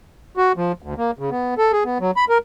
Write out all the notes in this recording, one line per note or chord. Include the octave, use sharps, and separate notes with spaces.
F#4
F3
D2
A#3
C#3
B3
A4
G#4
B3
F#3
B5
A#4